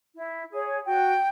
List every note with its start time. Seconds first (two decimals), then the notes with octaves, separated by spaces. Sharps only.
0.16 E4
0.50 G#4 C#5
0.86 F#4 G5